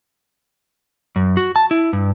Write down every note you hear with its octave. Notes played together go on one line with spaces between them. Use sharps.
F#2
F#4
A5
E4
G2